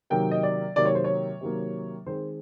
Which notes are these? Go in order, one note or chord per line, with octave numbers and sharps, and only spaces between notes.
C3 D#3 F#3 A#3 G5
D#5
D5
C3 D#3 F#3 A#3 D5
C#5
C5
C#5
C3 D#3 F#3 A#3
D#3 G#3 C4 C5